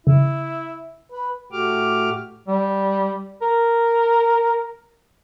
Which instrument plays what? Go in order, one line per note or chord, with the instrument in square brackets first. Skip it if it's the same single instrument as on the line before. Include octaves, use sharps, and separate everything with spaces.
[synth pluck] C#3 [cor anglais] E4
[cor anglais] B4
[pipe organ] A2 A3 F#4 G4 D6 F6
[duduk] G3
A#4